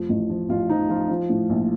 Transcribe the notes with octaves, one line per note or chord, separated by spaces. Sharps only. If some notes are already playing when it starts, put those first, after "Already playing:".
Already playing: F1 F3
A1
F3
A1 F4
F3 D#4
F3 F4
F3
A2
A#1